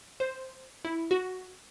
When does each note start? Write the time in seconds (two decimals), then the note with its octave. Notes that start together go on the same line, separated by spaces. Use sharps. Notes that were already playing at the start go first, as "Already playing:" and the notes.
0.20 C5
0.85 E4
1.11 F#4